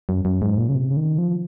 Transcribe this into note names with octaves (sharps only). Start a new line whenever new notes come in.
F#2
F#2
G#2
A#2
C#3
C3
C#3
D#3
F3